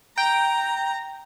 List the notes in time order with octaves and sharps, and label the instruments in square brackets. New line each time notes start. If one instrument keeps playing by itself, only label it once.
[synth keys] G5 [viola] A#5